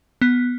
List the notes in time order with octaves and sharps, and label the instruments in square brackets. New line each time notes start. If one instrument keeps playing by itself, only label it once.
[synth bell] B3